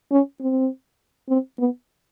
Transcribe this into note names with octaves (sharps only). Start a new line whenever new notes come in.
C#4
C4
C4
B3